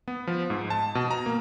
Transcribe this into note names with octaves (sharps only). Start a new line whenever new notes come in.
B3
F3
G#2
A5
B2
A#5
A#3